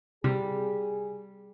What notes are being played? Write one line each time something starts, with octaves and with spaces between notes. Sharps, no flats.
C3 G3 G#4